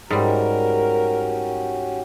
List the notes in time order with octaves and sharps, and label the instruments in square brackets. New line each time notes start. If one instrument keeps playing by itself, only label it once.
[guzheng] G#2 G3 [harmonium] C#4 F#4 G4 [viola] A#4